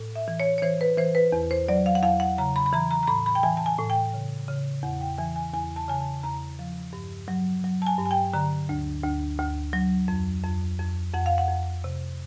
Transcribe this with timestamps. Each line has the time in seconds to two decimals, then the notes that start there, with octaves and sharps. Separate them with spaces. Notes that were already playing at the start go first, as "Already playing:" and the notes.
Already playing: A2
0.16 E5
0.28 E3
0.40 C#5
0.58 C#5
0.62 E3 C5
0.81 B4
0.98 E3 C5
1.15 B4
1.32 E2
1.51 C5
1.68 F#3 D5
1.86 F5
1.95 F#5
2.02 E2 F5
2.20 F#5
2.38 C#3 A#5
2.56 B5
2.66 B5
2.73 E3 A#5
2.91 A#5
3.03 A#5
3.07 A2 B5
3.26 B5
3.35 G5
3.43 E3 G#5
3.57 A5
3.66 G#5
3.79 A2
3.90 G5
4.14 C#3
4.48 C#3
4.83 E2 F#5
5.01 G5
5.18 E3 G#5
5.36 G#5
5.53 E2 G#5
5.76 A5
5.88 C#3 G#5
6.01 A5
6.23 E2 A#5
6.59 F3
6.93 G2
7.28 F#3
7.64 F#3
7.82 A5
7.86 G#5
7.98 G2
8.06 G#5
8.11 G5
8.33 D3 A#5
8.69 D2
9.04 D2
9.39 D2
9.73 F#3
10.08 F2
10.43 F2
10.79 F2
11.13 F2 F#5
11.26 F5
11.38 F#5
11.48 F2
11.84 C3